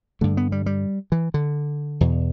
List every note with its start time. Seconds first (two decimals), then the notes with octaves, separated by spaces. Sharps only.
0.21 G2 D3 A3
0.37 B3
0.52 G3
0.66 G3
1.12 E3
1.34 D3
2.01 E2 B2